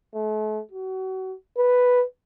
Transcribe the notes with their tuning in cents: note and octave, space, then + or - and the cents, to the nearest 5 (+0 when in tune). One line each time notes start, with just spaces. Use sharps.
A3 -40
F#4 +30
B4 +0